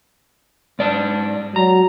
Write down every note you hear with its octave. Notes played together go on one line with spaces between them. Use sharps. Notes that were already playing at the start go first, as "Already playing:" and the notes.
G#2 D5 A5
F#3 A#5